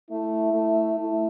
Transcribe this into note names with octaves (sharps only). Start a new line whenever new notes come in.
A3 E4
A3
A3 E4